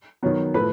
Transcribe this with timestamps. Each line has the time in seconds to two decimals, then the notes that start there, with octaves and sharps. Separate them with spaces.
0.23 D#3 F#3 B3
0.54 A2 F3 A3 B4 B5